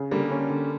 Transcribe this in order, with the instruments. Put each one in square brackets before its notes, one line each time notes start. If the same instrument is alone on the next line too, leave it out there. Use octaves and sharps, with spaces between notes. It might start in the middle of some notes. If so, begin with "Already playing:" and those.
Already playing: [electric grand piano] C#3
[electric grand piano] D3 [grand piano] G3 A#3
[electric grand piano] C#4
D3